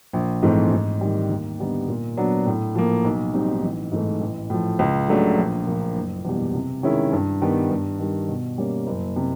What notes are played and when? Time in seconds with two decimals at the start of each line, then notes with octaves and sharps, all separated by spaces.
0.13 A#1
0.43 G#2 E3 A3 C4
0.71 G#2
1.01 D#3 G3
1.29 D#2
1.59 D3 G3 B3 D#4
1.88 A#2
2.17 F#3 B3 D4
2.47 A2
2.75 F3 A#3
3.05 B1
3.34 B2 G3 C4 D#4
3.63 A1
3.92 G#2 E3 A3
4.21 A1
4.50 A2 F3
4.79 C#2
5.08 C#3 F#3 A3 D4
5.37 A#1
5.67 A#2 F3 A#3
5.96 F#1
6.25 E2 B2 G3
6.54 C3
6.83 D#3 G#3 C#4 E4
7.12 G2
7.42 D#3 G3 B3
7.70 G2
7.99 D#3 G3
8.29 B2
8.58 G3 A#3 C#4
8.87 F#1
9.16 C3